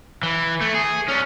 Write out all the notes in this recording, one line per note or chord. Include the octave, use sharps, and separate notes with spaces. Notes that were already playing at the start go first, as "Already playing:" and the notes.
E3
A3
G#4
C#4 D4